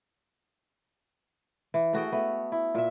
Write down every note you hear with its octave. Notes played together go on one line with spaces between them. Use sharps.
E3
A3 F#4 G#4 G5
A3 B3
E4
A#2 E5